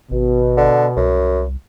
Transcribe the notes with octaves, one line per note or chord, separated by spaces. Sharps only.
G#1 B2
D3
C2 F#2